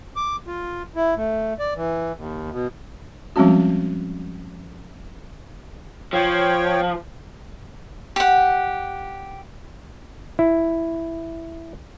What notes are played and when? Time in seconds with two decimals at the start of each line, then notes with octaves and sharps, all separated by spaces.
0.16 D6
0.47 F4
0.95 E4
1.17 A3
1.59 D5
1.76 E3
2.16 D#2
2.51 B2
3.36 F3 G3 G#3 C4 C#4 F#4
6.13 F3 C#5 G5
8.16 G4 F#5
10.39 E4